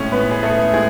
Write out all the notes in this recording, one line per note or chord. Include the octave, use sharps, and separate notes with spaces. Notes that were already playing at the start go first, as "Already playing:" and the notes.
Already playing: A2 G#3 C#4 C#5
B3 B4
G#4
A3 A4
A2 G#3 G#4